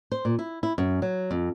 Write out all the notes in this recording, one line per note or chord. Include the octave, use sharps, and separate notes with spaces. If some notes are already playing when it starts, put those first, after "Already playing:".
C5
A#2
E4
E4
F#2
F#3
F2